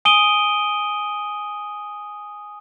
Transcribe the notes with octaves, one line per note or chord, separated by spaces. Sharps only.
G#5 D#6 D7 D#7 G7